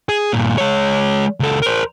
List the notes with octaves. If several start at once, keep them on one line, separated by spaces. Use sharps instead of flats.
G#4
G2 A#2
G#3 C#5
C#2 A4
A#4 C5